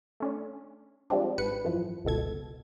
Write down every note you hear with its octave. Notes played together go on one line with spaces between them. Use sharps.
A3 C#4 D4
F3 G3 G#3 C4 D4
G#1 B4 C#7
F#2 E3 F3
G1 C#2 B2 A4 G#6